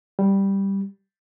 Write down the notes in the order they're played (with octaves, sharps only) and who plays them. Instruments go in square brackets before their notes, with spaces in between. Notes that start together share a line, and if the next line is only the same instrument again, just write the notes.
[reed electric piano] G3